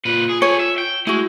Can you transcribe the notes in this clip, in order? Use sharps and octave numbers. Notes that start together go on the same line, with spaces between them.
A#2 F4 B4
G#4
A4 C#5 G#5
E5
G5
G#3 A3 E4 F#4